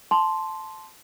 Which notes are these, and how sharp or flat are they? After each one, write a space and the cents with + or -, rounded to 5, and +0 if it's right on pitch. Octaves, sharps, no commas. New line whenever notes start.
A5 -10 C6 +0